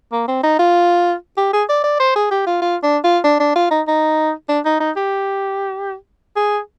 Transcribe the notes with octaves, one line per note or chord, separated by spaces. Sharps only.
A#3
C4
D#4
F4
G4
G#4
D5
D5
C5
G#4
G4
F4
F4
D4
F4
D4
D4
F4
D#4
D#4
D4
D#4
D#4
G4
G#4